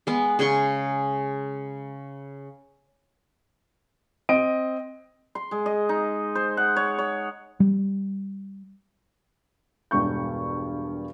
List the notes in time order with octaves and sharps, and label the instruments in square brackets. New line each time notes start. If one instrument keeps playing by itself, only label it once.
[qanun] G#3 B3
C#3 G#4 C6 C#6
[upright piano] C4 D#5 D7
[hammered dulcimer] C6
G#3
D#5
D#4
C5
F#5
C#5
C#5
[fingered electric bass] G3
[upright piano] E1 G2 C#6 G6